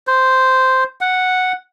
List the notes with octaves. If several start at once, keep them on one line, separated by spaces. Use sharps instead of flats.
C5
F#5